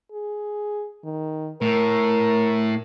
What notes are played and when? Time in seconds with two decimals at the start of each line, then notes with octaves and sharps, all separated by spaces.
0.12 G#4
1.04 D#3
1.62 A2 A#4